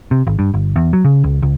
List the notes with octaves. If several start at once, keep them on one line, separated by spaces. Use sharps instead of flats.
C3
G#1
G2
G1
E2
F#3
C#3
C#2
C#2